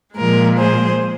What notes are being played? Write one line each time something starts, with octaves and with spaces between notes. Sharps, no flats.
A#2 F3 G#3 A#4
G#4 C5